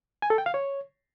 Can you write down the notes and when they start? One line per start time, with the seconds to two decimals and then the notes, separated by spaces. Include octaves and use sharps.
0.22 G#5
0.30 A4
0.38 G5
0.46 F5
0.54 C#5